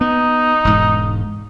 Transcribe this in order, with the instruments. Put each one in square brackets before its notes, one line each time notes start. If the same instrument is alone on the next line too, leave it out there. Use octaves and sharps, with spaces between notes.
[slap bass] B3 [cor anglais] D#4
[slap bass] E1 G#2